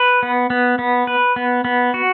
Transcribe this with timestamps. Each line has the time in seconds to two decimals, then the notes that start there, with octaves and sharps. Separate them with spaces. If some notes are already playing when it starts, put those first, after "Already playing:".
Already playing: B4
0.23 B3
0.50 B3
0.79 B3
1.07 B4
1.36 B3
1.65 B3
1.94 F#4